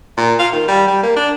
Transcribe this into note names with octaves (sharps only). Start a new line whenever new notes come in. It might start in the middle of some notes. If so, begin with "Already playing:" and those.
A#2
F4
D#3
G3
G3
A#3
D4